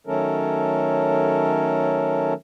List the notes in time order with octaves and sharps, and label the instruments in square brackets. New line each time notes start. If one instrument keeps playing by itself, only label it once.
[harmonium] D#3 F#3 A3 C#4 A4 A#4